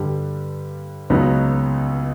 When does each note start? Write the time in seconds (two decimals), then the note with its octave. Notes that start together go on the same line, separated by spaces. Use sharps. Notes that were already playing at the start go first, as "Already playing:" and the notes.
Already playing: G2 D3 G3
1.10 C#2 C#3 F#3 B3 D#4